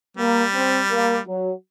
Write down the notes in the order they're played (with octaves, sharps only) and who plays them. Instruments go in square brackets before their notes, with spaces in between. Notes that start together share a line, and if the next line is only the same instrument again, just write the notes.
[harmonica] G3 [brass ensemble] A#3
[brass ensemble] C4
A#3
F#3